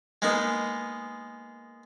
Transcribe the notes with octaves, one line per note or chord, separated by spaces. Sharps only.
G#3 A#3 B3 D#4